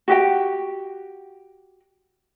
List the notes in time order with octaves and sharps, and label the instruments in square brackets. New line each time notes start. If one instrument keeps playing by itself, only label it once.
[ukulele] F#4 G4 G5